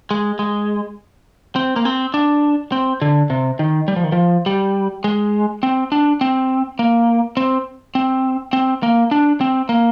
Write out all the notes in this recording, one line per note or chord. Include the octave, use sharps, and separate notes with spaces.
G#3
G#3
C4
A#3
C4
D4
C4
D3
C3
D#3
G3
F3
D#3
F3
G3
G#3
C4
D4
C4
A#3
C4
C4
C4
A#3
D4
C4
A#3